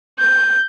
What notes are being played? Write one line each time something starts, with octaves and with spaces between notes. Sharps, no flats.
G6